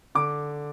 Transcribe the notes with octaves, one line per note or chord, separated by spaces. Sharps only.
D3 D6